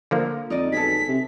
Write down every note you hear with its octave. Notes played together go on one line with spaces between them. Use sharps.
D3 F3 A#3
F2 D#4 D5 D#5
B1 G#4 A4 B6
C3